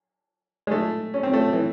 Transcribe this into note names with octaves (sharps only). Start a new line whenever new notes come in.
G#3
A3
C#4
C4
A3
E3